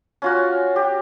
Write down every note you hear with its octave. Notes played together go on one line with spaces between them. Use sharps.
C#4 F4 F#4
G4